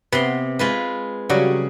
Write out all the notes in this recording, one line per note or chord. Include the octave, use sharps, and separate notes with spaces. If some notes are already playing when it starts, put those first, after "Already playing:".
C3 B3 C6
G#3 F4 B4
C#3 F#3 G3 F#4